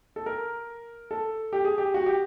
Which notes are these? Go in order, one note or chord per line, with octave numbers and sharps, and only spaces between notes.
A4
A#4
A4
G4
G#4
G4
F#4
G4